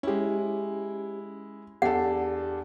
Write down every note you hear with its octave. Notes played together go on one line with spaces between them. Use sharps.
G#3 C#4 E4 G4
E2 D4 G4 A4 F#5